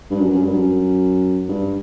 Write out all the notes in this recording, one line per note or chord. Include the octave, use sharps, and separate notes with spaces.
G2
F#2
F#2
G2
F#2
G2